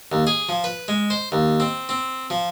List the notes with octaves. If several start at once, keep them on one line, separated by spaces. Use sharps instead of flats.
D#2
G#4
F3
B4
G#3
C5
D#2
C4
C4
F3